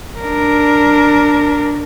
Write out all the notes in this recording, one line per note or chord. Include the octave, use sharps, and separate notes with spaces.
D4 A#4